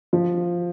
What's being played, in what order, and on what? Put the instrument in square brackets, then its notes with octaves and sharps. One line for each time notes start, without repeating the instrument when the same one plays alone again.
[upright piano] F3